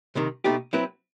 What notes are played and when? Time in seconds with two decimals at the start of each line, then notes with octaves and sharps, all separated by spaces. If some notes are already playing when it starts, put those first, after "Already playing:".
0.15 C2 C3 D#3
0.44 B2 A3 D#4 G4
0.73 F#3 C4 E4 B4